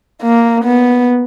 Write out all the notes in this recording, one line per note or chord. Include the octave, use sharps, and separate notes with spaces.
A#3
B3